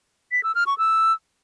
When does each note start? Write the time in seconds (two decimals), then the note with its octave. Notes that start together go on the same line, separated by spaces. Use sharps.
0.32 B6
0.43 E6
0.55 F6
0.67 C#6
0.78 E6